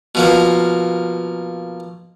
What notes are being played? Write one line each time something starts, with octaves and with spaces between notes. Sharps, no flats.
B2 F3 A#3